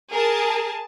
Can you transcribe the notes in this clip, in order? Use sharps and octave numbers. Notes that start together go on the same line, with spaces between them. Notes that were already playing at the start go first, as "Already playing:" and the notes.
G#4 A#4 A5